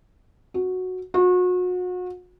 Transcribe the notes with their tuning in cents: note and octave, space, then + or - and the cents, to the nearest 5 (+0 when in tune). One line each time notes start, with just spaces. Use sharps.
F#4 -5
F#4 -35